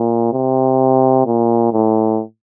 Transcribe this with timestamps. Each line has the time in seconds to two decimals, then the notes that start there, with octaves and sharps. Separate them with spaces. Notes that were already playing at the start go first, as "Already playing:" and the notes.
Already playing: A#2
0.33 C3
1.26 A#2
1.73 A2